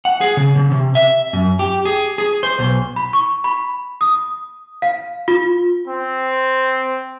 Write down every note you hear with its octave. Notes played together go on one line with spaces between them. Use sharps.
F#5
G#4
C#3
C#3
C3
E5
F#2
G4
G#4
G#4
C5
B1
B5
C#6
B5
D#6
F5
F4
C4